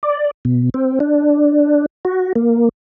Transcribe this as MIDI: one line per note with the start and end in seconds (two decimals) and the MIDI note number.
0.03 0.31 74
0.45 0.70 47
0.74 0.99 60
1.00 1.86 62
2.05 2.33 66
2.36 2.69 58